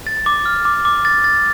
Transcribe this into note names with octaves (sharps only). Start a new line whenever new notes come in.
A6
D6
F6
D6
D6
A6
A6